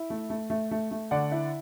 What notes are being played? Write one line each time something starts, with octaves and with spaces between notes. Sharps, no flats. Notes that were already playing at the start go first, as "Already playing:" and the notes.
Already playing: E4
A3
A3
A3
A3
A3
D3 D5 F#5
E4